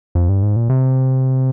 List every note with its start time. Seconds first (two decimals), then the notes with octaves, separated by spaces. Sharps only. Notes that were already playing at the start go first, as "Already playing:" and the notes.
0.15 F2
0.29 G2
0.43 G#2
0.56 A#2
0.69 C3